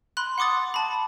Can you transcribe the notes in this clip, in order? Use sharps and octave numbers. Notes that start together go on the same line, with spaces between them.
B5 C6 F#6
F#5 C6 D6 D#6 A6
A5 B5